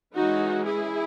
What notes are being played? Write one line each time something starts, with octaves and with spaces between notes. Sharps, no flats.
E3 G#3 C#4 D#4 F#4
E4 G#4